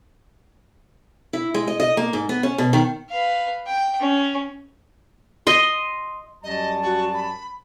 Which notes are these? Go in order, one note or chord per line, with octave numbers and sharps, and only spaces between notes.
E4
G#3
D#5
D#5
A#3
G#2
B3
C#4
B2
D#3
B4 F5
G5
C#4
D#5 C6
F#2 G3 D#5 A5
F#4
B5